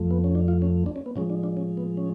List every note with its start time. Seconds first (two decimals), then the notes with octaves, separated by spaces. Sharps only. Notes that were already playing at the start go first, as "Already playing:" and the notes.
Already playing: F2 F3 A3
0.11 B3
0.24 C#4
0.35 D4
0.48 F4
0.62 C#4
0.86 D4
0.96 C#4
1.06 B3
1.16 A2 F3 G#3 C#4
1.30 D4
1.43 D4
1.57 C#4
1.77 B3
1.97 C#4